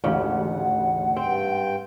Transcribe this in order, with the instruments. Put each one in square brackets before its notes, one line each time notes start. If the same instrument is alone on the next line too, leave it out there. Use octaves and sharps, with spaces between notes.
[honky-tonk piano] A1 D2 [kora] G#2 C#3 [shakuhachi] F#5
[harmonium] G2 G5 [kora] C4